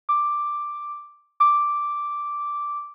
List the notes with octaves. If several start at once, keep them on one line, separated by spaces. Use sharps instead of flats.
D6
D6